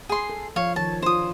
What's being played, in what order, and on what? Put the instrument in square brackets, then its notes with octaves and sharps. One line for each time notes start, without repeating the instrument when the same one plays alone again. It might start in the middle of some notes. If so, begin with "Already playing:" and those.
[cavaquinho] G#4 C6
[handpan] A4
[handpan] F3 [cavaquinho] C#5 F5
[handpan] D#3 F3 C#5 [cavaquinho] A5
[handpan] D4 F4 [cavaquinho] C5 D#6